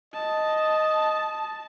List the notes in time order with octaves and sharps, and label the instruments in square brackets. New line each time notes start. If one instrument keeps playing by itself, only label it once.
[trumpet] D#5 [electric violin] A5